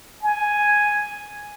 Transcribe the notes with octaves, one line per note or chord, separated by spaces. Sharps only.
G#5